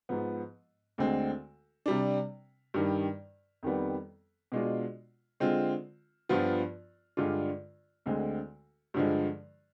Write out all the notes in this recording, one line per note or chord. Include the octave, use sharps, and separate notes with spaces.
G#2 F3 B3
D2 D3 G#3 C4
C3 G3 D4
G2 D#3 G3
F2 D#3 G3 B3
B2 G#3 D4 F4
D3 G#3 C4 F4
G2 F3 B3 F4
G2 D3 G#3 D4 F4
D2 D3 G#3 C4
G2 D3 F3 G#3